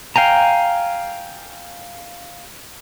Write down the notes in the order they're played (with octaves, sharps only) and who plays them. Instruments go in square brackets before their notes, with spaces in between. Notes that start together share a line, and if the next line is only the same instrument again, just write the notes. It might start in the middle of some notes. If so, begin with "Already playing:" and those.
[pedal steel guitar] F5 G5 G#5 A#5